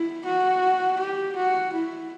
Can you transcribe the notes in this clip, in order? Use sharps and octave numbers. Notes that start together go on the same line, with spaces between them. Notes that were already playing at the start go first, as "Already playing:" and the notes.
Already playing: E4
F#4
G4
F#4
E4